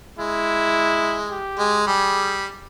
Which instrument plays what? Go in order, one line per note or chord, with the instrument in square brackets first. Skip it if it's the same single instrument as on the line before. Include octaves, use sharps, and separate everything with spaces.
[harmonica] G#3 [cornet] E4
[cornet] G4
[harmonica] G#3
[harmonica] G3 [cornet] G#4